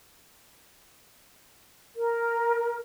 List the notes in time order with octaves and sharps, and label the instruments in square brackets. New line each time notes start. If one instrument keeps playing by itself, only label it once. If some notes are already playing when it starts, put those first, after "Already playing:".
[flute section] A#4